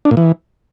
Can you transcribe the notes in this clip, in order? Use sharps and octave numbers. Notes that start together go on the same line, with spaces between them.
D4
A#2
E3